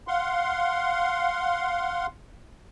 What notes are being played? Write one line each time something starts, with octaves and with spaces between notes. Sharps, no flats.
F5 F#5 C6